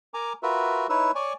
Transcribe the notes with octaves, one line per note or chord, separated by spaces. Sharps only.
A#4 G#5 A#5 D6
F4 F#4 A#4 B4 E5
D#4 E4 B4 C#5 E6
C#5 D5 G#5 C#6